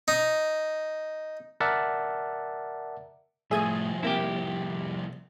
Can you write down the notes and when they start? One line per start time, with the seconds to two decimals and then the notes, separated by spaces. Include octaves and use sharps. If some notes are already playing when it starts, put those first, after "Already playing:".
0.08 D#4
1.60 A#4 D5 E5 F#5 A5
3.51 C2 A2 F3 G#4 E5 D#6 G#6
4.03 C3 A#3 E4 G4